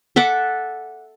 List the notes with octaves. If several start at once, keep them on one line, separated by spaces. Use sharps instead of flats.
A4 E5 F#5 D6